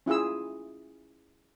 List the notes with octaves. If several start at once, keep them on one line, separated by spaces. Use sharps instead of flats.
C#4 E4 F4 G#4 E6